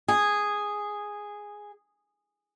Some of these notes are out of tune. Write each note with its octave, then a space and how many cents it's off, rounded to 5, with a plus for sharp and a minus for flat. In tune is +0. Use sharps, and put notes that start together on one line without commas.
G#4 -5